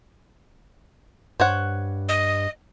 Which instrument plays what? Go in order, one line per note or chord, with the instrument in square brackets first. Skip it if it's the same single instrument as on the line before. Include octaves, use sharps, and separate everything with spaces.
[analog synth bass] G2 [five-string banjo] C5 C#5 F#5
[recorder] D#5